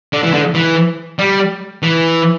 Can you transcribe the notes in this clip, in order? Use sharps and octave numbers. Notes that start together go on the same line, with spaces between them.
D3
E3
D3
E3
G3
E3